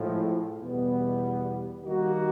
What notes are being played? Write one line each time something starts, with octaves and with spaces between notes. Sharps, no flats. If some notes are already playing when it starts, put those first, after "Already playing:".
Already playing: A2 F3 G#3
E2 B2 G3 B3
D#3 G3 A#3 D#4 F#4